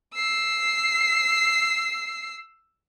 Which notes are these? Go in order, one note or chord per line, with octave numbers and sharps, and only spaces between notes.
E6 C7